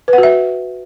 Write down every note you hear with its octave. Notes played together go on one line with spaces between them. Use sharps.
B4
F#5
F#4
E5